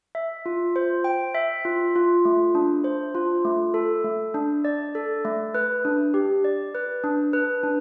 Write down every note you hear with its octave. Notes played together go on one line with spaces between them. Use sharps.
E5
F4
C5
G5
E5
F4
F4
A3
D4
C5
F4
A3
A4
A3
D4
D5
A4
A3
B4
D4
G4
D5
B4
D4
B4
D4